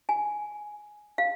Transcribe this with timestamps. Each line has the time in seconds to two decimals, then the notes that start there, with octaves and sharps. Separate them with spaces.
0.09 G#5
1.18 F5